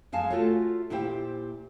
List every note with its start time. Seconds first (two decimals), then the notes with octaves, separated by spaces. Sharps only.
0.12 F#2 G#3 F5 G#5 A5
0.30 A3 F4 F#4 A4 C#5
0.90 A#2 E4 G4 C5 G5